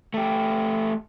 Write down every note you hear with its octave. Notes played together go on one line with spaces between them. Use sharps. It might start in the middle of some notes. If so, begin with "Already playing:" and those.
A3 G4